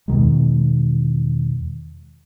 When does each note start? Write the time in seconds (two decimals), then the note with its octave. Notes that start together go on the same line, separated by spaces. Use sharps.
0.08 E2 B2 D#3 G#3